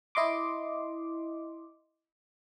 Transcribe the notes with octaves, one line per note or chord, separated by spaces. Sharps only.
E4 D#5 C6 D6